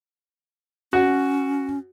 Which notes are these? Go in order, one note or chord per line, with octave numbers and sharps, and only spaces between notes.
C#4 F#4